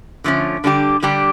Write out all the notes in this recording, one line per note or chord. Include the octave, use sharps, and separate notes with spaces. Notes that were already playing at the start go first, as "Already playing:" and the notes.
D3 F3 A3 C#4
D3 G3 D4 G4
D3 G3 D4 G4